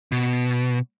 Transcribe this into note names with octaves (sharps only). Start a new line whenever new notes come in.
B2